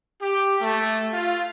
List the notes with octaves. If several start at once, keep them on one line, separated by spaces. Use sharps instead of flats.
G4
A3
F4